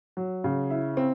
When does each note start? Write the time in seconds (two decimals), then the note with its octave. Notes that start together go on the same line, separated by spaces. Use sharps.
0.17 F#3
0.44 C#3
0.70 E4
0.97 C4